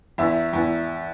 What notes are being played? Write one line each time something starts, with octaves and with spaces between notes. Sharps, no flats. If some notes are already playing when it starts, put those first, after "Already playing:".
E2 E5
E2